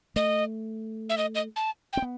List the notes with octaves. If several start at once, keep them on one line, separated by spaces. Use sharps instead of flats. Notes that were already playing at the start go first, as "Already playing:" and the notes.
A3 D#5
E5
D#5
D#5
A5
C4 G5
B3